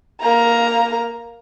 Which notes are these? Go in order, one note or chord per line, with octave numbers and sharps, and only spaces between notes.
A#3 A#5